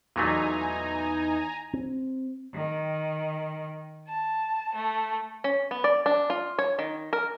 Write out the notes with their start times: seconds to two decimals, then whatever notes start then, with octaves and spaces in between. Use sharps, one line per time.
0.16 E2 A#2 F#3 A3 D#4 G#5 A#5
1.74 C4
2.55 D#3
4.08 A5
4.75 A3
5.44 C#4
5.71 B3
5.84 D5
6.06 D4
6.30 F4
6.58 C#5
6.79 D#3
7.13 A#4